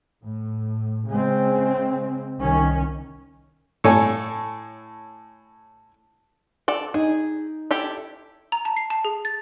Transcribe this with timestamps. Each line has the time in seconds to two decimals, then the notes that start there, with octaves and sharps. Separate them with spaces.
0.23 A2
1.09 C#3 G#3 C4
2.41 C2 D#3 C#4
3.84 A2 A4 C#5 G#5
6.68 A4 D5
6.94 D#4 G#4
7.71 E4 G4 A4
8.52 A#5
8.65 A5
8.77 C7
8.90 A5
9.05 G#4
9.25 A6